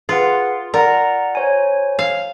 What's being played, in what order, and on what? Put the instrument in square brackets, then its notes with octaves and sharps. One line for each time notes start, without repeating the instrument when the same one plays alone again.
[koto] F4 [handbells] G#4 B4 F#5
[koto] A#4 [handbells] D5 F#5 A#5
[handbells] C5 C#5 G#5
[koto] F5